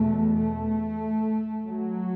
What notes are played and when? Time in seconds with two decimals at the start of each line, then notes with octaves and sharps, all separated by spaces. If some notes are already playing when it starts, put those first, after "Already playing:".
Already playing: E2 B2 A3
0.37 A3
1.67 F#3